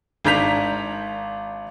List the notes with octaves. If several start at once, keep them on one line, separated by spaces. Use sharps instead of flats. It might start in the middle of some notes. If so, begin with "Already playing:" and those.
G#1 D4 A#5 G6 B6 F7